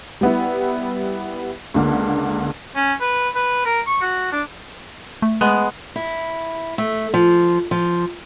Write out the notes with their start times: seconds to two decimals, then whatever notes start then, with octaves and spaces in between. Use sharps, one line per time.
0.21 G3 B3 E4
1.74 C#2 D3 A#3
2.76 C#4
3.01 B4
3.35 B4
3.65 A#4
3.87 C#6
4.02 F#4
4.32 D4
5.22 A3
5.41 G#3 B3
5.96 E4
6.78 A3
7.14 F3
7.71 F3